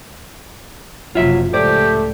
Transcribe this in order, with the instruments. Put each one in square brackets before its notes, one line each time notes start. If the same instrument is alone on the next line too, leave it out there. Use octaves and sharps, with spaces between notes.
[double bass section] F#1 C3 F3 [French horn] F#3 [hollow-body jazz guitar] F4 E5
[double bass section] C#2 A2 [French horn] A3 [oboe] G4 [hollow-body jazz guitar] C5 D5